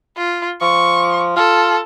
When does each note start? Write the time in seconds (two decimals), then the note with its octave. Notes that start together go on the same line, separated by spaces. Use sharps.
0.17 F4
0.61 F3 C#6
1.36 F4 A4